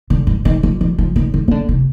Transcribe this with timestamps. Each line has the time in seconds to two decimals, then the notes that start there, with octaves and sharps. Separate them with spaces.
0.10 D3
0.27 G2
0.45 D#3
0.63 F3
0.81 F3
0.98 F3
1.16 D#3
1.34 D3
1.48 D#3
1.51 D3
1.69 C3